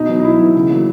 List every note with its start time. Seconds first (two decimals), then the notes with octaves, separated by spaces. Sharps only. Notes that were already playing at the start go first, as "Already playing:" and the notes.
Already playing: B2 D#4
0.09 F#3 B3
0.20 D#4
0.24 B2 E4
0.39 F#3 B3
0.55 C#3
0.70 F#3 A#3